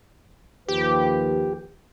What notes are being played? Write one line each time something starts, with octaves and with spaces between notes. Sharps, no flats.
D#2 F3 G4 B4